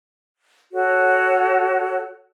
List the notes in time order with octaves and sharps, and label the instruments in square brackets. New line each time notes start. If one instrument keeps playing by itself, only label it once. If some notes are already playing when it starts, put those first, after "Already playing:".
[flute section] F#4 A4 C#5